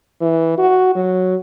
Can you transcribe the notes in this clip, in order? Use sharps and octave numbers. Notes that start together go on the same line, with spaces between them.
E3
F#4
F#3